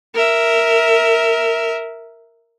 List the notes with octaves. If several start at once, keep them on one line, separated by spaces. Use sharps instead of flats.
A#4 E5